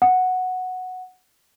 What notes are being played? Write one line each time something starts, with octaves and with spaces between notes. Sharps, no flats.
F#5